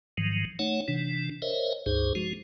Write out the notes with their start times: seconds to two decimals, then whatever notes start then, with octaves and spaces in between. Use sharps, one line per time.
0.18 G#2 D#3 F3 F#3
0.59 A3 D#4 C#5 F#5
0.88 C3 E3 D4
1.42 A#4 C5 C#5 D#5 E5
1.86 C#2 G2 D#4 G#4 C5
2.15 F3 G#3 F#4